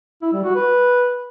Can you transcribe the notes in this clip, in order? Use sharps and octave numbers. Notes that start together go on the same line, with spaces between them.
E4
G3
F#4
B4